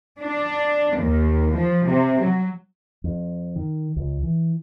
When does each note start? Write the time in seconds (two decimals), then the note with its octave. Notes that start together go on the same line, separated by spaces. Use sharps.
0.19 D4
0.98 D#2
1.56 F3
1.87 C3
2.21 F#3
3.04 F2
3.56 D#3
3.96 C#2
4.23 E3